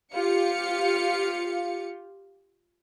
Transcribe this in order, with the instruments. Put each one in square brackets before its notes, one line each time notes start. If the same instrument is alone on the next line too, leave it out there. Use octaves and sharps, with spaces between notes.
[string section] F4 G4 F5 C#7